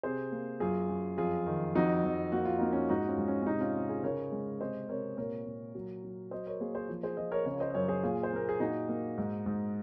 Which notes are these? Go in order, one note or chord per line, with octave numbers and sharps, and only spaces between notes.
C3 G#4 C5
A#3
F#2 F4 G#4
F#2
F2 F4 G#4
D#3
F2 D#4 F#4
F2
A#3 F#4
F4
A#3 D#4
C#4 F4
G#2 D#4 F#4
C#4 F4
G#2
C#4
C#4
C3 D#4
C#4 F4
C3
F4 G#4
C#3 A#4 C#5
G#3
C3 C5 D#5
C3 A#4 C#5
A#2 A#4 C#5
A#2
F#3
F#3
F#3 C5 D#5
A#4 C#5
A#3 G#4 C5
G#4 C5
F3
G#4 C5
F3 C5 D#5
A#4 C#5
C#3 A#4 C#5
C#5
C5 D#5
D#5
F#2 A#4 C#5
G#4 C5
A#2 F4 G#4
C5
A#3 A#4
G#4
A#2 D#4 F#4
A#3
G#2
G#2